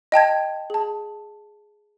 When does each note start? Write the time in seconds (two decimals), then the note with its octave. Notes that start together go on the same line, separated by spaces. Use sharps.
0.12 D#5 G5 A5 G#6
0.70 G#4 A5